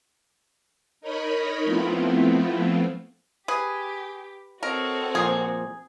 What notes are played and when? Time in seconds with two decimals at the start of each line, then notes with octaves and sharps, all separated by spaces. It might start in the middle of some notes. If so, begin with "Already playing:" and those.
1.01 D#4 A#4 C#5 D#5 B5
1.63 F3 A3 B3 C4 E4 F4
3.48 G4 G#4 B4
4.63 C4 F#4 A4 A#4 C#5 D#5
5.15 A#2 F3 G#4